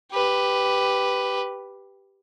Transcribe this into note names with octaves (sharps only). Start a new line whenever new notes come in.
G4 B4